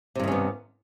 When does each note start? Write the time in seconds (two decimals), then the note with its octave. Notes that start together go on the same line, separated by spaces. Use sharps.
0.15 C3
0.20 G2
0.24 D#3
0.28 C#4
0.32 B3